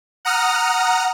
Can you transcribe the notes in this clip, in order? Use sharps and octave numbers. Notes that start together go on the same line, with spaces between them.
F#5 A#5 D#6 F6